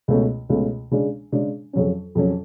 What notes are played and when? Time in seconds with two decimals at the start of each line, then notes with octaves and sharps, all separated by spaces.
0.08 C#2 B2 A3 C#4
0.49 C#2 B2 A3 C#4
0.91 C#3 G#3 D4
1.32 C#3 G#3 D4
1.73 F2 C#3 F#3 C#4
2.15 F2 C#3 F#3 C#4